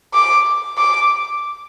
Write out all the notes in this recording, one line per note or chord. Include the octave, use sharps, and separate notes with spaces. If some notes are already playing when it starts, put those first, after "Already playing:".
D6
D6